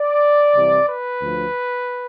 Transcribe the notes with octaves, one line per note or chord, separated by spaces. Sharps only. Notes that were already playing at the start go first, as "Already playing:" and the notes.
Already playing: D5
C2 C3 E3
B4
D2 D3 F3